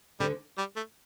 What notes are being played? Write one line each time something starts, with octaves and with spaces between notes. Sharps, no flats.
D2 D3 G3
G3
A3